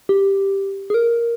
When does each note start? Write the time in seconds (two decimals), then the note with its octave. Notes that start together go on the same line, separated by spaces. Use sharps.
0.09 G4
0.90 G#4
0.94 A#4